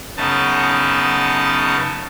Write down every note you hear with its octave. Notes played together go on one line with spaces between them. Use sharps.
F#2 C#3 B3 D#4 A5